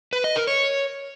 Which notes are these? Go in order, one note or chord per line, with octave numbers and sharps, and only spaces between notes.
B4
D#5
A#4
C#5